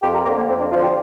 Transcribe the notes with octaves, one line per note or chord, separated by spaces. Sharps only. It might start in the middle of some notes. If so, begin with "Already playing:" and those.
F2 G4
A#4
D3 F3 A#3
A#3
F2 C4
D4
D3 F3 F4
G4